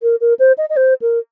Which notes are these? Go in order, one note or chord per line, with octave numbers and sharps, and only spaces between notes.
A#4
A#4
C5
D#5
D#5
C5
A#4